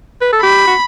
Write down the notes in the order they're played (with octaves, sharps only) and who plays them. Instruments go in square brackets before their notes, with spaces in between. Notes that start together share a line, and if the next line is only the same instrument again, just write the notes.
[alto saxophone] B4
A4
[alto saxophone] G4 [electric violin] B5
[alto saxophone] F#4